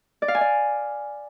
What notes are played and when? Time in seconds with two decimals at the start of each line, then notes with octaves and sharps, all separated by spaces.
0.22 D5
0.28 F5
0.35 G#5
0.41 D5